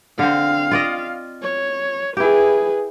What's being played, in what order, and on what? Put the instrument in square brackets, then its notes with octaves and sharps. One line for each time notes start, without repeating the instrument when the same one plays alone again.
[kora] D3 C4 [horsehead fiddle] F5
[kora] F4 D5 D#5
[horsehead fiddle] C#5
[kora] E4 G4 [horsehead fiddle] G#4 B4